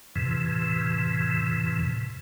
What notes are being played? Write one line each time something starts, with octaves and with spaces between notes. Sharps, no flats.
F2 A2 C3 E3